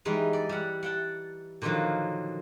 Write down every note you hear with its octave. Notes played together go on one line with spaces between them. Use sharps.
E3 G3 G#3 D#4
D5
G3 F#5
F#5 G5 A5
A#2 D3 D#3 F3 F#3 A#3